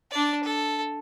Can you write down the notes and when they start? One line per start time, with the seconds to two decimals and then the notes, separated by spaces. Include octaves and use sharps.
0.11 D4 D5
0.44 A4